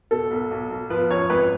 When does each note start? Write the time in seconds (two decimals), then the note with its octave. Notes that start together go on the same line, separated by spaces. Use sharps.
0.11 B2 A4
0.31 B1
0.51 B1
0.71 B1
0.90 F3 B4
1.10 F#2 C#5
1.30 G#1 B4